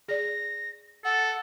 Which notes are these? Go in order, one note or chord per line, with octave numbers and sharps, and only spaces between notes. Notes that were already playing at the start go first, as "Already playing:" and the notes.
G#4 D5 A#6
A4 F#5